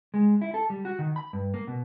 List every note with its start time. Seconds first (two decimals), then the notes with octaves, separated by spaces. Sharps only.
0.14 G#3
0.41 E4
0.54 A4
0.70 G3
0.85 F#4
0.99 D#3
1.16 B5
1.33 G2
1.54 A#3
1.67 B2